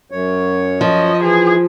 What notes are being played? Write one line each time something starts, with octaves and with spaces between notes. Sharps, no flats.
F#2 C#5
F3 D#5
E3 G#4